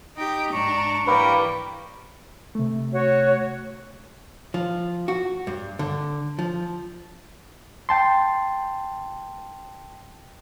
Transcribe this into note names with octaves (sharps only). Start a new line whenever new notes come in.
D#4 G4 D#5 G5
G#2 D4 A#5 C#6
E3 G3 A#3 G4 A#4 B4
C3 A3
F#4 C#5
F3
F#4
G2
D3
F3
G5 A5 C6